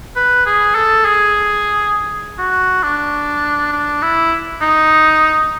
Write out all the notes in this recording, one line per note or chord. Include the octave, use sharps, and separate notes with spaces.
B4
G#4
A4
G#4
F#4
D4
D4
E4
D#4